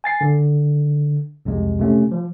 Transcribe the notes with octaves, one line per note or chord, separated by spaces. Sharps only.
G#5 A6 C7
D3
C2 F2 C3 G#3
C3 A3 C#4
F3